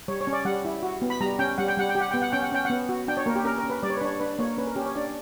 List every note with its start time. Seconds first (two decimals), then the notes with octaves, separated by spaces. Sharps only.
0.08 G3 C#5
0.21 C#5
0.27 C#4
0.33 D5
0.45 G3 F#5
0.65 E4
0.83 F#4
1.02 B3
1.10 B5
1.21 G3 A#5
1.39 C#4 G5
1.58 G3 F#5
1.68 G5
1.77 G3 F#5
1.89 G5
1.95 G4
2.00 F#5
2.11 B3 G5
2.22 F#5
2.32 C#4 G5
2.43 F#5
2.52 C#4 G5
2.65 B3 F#5
2.89 F#4
3.08 D4 G5
3.17 C#5
3.26 A#3 A#4
3.36 G4
3.45 C#4 A#4
3.58 A#4
3.64 C#4
3.70 B4
3.83 G3 D5
3.90 C#5
3.97 B4
4.01 D4 C#5
4.20 D4 B4
4.39 A#3 C#5
4.57 C#4 B4
4.67 A#4
4.76 C#4 G4
4.86 C#5
4.95 D4 D5